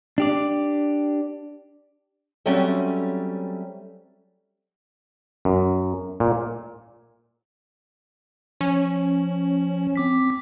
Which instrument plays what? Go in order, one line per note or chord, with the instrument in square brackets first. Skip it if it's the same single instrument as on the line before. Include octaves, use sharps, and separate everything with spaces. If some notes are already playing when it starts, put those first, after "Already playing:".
[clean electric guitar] D4 G4 D5
[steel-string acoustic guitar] F#3 G3 A3 C4 C#4
[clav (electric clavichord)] F#2
A#2
[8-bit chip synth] F3 [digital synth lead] C#4
[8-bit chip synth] C4 D6 B6